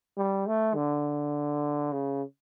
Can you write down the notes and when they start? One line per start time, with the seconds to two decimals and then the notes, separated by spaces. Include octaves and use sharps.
0.17 G3
0.47 A3
0.75 D3
1.92 C#3